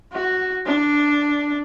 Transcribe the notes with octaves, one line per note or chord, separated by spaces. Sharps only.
F#4
D4